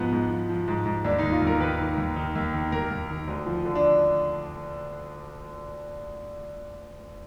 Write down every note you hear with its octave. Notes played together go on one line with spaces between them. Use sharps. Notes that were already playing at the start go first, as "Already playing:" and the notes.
Already playing: G#2 F3 B3
G#2
F3
F3
G#2
G#2
D#2 D4
D#4
D#2
F4
D#2 A#4
D#3 B4
D#3
D#2
D#3
D#2
D#3
D#2 A#4
D#2
D#3
D2
F3
D3
D4